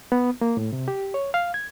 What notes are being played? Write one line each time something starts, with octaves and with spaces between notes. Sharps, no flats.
B3
A#3
A2
C3
G4
C#5
F5
G#6